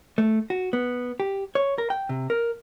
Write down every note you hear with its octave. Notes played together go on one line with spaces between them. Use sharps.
A3
F#4
B3
G4
C#5
A#4
G5
C3
A#4